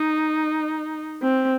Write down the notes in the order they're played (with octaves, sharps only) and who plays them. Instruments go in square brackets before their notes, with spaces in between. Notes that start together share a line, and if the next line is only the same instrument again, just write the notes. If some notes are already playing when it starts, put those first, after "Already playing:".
Already playing: [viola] D#4
C4